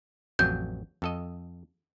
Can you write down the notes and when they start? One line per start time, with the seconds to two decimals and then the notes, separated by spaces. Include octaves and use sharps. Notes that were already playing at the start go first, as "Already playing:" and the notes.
0.39 A1 F2 F#3 G6
1.02 F2 A4 D#5